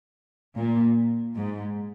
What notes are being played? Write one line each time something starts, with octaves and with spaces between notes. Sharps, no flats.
A#2
G#2